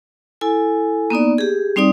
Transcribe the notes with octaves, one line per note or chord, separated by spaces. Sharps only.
E4 A4 G#5
A#3 B3 D#4 D5
G4 G#4
G3 C4 D#4 D5 D#6